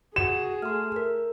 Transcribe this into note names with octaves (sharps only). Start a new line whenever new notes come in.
F#4 G#4 E7
A3 C6 F6
A#4